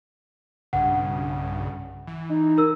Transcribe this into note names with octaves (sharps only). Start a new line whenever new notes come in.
B1 G2 C#3 F#5
E3
D#4
A#4 E6